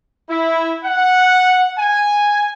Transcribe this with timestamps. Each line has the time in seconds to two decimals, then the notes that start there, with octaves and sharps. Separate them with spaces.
0.29 E4
0.84 F#5
1.78 G#5